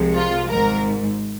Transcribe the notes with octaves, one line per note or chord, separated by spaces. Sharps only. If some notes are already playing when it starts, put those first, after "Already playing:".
Already playing: C2 C3 F3 G#3
F4
G#1 G#2 A#4